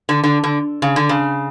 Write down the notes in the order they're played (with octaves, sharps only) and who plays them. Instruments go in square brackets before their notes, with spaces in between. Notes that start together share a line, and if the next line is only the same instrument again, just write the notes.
[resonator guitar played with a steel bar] D3
D3
D3
C#3
D3
C#3